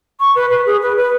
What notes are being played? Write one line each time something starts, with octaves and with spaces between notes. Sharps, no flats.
C#6
B4
B4
G#4
B4
B4